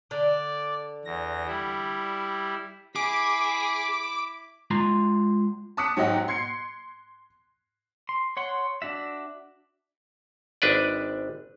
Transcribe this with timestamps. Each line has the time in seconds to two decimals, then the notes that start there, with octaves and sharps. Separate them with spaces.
0.11 D3 D5
1.05 E2 A#6
1.47 G3 E4
2.96 E4 G#4 D6 B6
4.71 G#3 F4 A#5 C6
5.77 A5 D6 D#6 F#6 B6 C#7
5.97 G#2 F#3 G4 D#5 F#5 A#6
6.28 C6 G#6 C7 C#7
8.09 C6
8.37 C#5 F#5 C6
8.82 D4 F#4 E5
10.62 G#1 D4 B4 D5